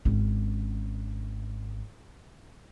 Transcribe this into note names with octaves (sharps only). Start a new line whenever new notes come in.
G#1 C#4